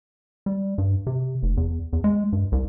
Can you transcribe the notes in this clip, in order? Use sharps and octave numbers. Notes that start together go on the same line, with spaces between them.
G3
G2
C3
F1
E2
E2
G#3
G2
C2